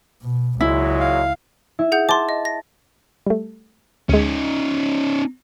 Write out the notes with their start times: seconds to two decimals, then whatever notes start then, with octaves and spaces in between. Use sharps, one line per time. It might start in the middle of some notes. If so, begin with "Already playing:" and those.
0.23 B2
0.60 C#2 A#2 F#3 G#3 E4
1.00 F5
1.79 E4
1.92 G#4 F#5 G6
2.09 A5 C6 D6
2.29 D#5
2.45 A#6
3.26 G3 A3
4.09 D2 G#3 C#4 D#4